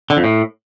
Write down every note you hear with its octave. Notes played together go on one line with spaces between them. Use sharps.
D3
F2
A2